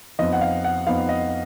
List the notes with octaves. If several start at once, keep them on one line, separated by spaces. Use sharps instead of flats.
F2 F3 B3 D#4 D#5
F#5
F5
F#5
F2 F3 B3 D#4 F5
D#5